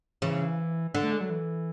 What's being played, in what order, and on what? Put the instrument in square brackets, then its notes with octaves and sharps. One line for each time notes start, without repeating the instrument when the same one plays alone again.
[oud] C#3 [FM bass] E3
[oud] D3
[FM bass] A3
G#3
F#3
E3